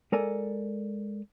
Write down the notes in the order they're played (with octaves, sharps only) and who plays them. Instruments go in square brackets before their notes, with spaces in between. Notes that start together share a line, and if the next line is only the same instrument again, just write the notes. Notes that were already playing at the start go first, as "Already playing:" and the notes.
[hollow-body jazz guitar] G#3 A4 A#4 D5 G#5